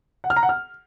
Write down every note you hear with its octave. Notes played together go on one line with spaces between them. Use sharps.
F#5
F6
A#5
F#5
F6